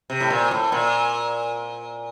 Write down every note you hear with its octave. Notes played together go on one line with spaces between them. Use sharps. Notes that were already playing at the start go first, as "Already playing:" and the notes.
C3
A2
A#2
A2
A#2